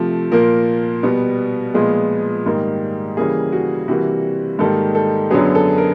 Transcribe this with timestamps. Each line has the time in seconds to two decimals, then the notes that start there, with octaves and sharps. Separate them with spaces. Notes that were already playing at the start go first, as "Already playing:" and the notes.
Already playing: C3 F3 A3
0.31 A#2 F3 A#3 A#4
1.03 B2 G3 B3
1.74 A#2 F3 G#3 B3 G#4
2.46 G#2 D#3 G3 A#3
3.17 C#3 E3 G3 A#3 G#4
3.53 F#4
3.88 C3 E3 G3 A#3 F#4
4.59 G#2 D#3 G3 A#3 A4
4.95 A4
5.30 F#2 D3 F#3 B3 G#4
5.55 A4
5.78 A#4